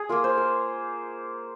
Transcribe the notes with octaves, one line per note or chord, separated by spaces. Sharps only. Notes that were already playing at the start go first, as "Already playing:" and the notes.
Already playing: G#4
A#3 F4 A#4
C5
A#4